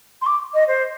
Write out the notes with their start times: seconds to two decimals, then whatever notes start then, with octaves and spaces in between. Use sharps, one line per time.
0.21 C6
0.26 D6
0.54 D#5
0.67 C5